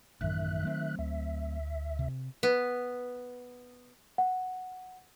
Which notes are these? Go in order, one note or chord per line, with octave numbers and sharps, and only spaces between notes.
A1 F#2 D#3 E5 F#6
F#3 A3 C4
D2 E5
C3
B3
F#5